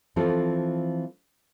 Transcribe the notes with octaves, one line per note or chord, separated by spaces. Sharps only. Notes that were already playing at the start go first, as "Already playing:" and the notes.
E3 F3 C4 F4 A4